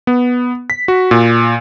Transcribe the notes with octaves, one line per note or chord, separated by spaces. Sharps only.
B3
B6
F#4
A#2